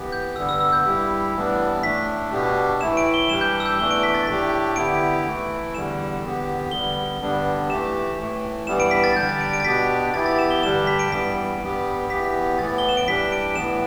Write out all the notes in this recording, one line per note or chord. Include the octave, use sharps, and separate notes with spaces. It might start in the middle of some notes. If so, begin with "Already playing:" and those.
Already playing: E3 B3 G4
G6
G2 D3 G3 B3 E6
E6
E6
G6
G2 G3 E4 G4
A2 E3 G3 B3 D4
A2 A3 D4 B6
B2 B3 D4 G4
A2 E3 A3 E4 E7
D7
G7
E3 G3 D4 G4 E7
G6
E6
G6
E2 E3 A3 D4 G7
D7
B6
A6
A2 A3 D4 G4 B6
D3 B3 E4 G4 D7
E3 A3 E4
E2 D3 G3 E7
E2 D3 B3 G4
D3 G3 B3 G7
G2 D3 G3 B3 D4
E3 A3 G4 E7
A2 E3 A3
G2 E3 G3 B3 E7
D7
B6
A6
D3 G3 D4 G4 G6
A6
D7
D7
A6
B2 B3 D4 G4 B6
E3 B3 E4 G4 A6
A6
E7
G7
G2 D3 G3 D4 G4 E7
B6
D7
G2 E3 G3 B3 B6
G2 G3 B3 G4
E2 E3 B3 G4 B6
A2 E3 B3 A6
G7
E7
D7
E3 G3 D4 G4 B6
D7
A2 E3 B3 E7